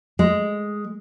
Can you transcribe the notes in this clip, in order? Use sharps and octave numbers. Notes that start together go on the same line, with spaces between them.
G#3